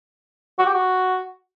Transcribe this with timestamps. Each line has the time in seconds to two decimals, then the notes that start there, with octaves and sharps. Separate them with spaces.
0.59 F#4
0.66 G4
0.74 F#4